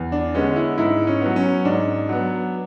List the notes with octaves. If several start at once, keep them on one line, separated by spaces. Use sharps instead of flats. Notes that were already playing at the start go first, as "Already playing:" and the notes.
Already playing: E2
D4
D3 G#3 B3 C#4
E4
G#2 E4
C#4
F#3 B3
C#4
G#2 D4
F#3 B3